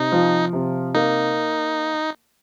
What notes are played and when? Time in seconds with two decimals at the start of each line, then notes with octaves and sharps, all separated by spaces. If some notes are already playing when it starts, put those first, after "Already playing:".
Already playing: C3 D#4
0.12 F3
0.53 C3
0.95 A#3 D#4